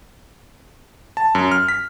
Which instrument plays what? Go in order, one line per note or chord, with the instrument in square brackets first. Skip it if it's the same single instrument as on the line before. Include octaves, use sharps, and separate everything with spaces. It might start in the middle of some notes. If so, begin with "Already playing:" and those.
[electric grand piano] A5
F#2
F6
B6